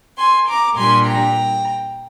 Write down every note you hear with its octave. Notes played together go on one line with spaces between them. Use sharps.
G#5 C6
A#5 D6
A#2 G3 D4 G#5 C6
G5 A#5